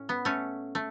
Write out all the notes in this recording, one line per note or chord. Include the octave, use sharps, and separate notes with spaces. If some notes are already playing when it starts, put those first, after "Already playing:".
Already playing: A2 C#4
B3
A3 C#4
A3